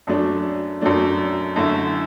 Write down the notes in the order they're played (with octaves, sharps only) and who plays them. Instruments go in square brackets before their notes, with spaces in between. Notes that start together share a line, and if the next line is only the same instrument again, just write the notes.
[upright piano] F#2 F#3 A3 D4
F#2 F#3 A3 D4
F#2 D3 A3 E4